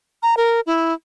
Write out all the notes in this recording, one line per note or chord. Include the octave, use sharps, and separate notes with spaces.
A#5
A#4
E4